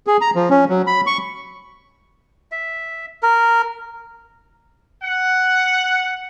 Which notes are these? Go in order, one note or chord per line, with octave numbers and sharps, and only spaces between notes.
G#4
A#5
F3
C#4
F#3
B5
C#6
E5
A#4
F#5